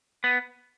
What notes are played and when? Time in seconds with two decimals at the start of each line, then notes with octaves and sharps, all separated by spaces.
0.24 B3